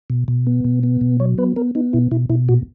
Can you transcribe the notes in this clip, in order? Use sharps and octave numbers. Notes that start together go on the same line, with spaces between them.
B2
B2
B3
B2
B3
B2
F#3 C#5
B3 B4
B3 A#4
B3 D#4
B2 E4
B2 E4
B2 E4
A#2 F#4